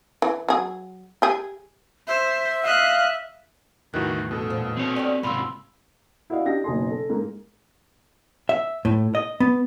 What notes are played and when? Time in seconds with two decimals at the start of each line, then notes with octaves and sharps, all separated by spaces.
0.22 E3
0.49 F#3 G#4
1.22 G4 G#4
2.07 C5 E5
2.64 D#5 F5 F#6
3.94 E2 A2 D#3 E3 F#4 F#6
4.31 B2 A4
4.50 A#2 C5
4.77 C4 C#5
4.96 F#4 G4 D5
5.23 E2 G#2 C3 C#4 F4 B5 C6 E6
6.30 E4 F#4 D5 D#5 F5
6.45 D4 G4 D#5 A#6
6.64 F#1 B2 D#4 G#4 G#5 C6
6.90 A4
7.09 G#2 A#3
8.49 E5
8.85 A2
9.15 D#5
9.40 B3